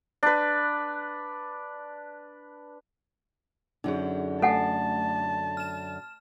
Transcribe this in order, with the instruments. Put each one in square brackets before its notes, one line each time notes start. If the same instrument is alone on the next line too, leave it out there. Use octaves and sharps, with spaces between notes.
[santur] D4 B4
[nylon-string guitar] F#2 D3 [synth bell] D#4 G#4
[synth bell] A3 [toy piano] A4 F#5 G#5 [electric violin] A5
[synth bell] F6 E7